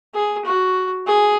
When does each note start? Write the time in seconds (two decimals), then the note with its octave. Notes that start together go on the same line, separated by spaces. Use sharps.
0.14 G#4
0.45 F#4
1.07 G#4